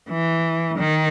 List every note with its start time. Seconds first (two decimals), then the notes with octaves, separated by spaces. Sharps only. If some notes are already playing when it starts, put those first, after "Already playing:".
0.10 E3
0.78 D#3